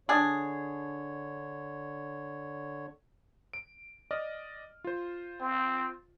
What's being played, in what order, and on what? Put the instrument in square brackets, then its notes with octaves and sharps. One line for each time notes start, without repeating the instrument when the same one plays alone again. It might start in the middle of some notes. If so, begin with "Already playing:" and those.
[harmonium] D3 C#5 [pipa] D4 G#4
[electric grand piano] D7
D5 D#5 F6
F4 C5
[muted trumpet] C4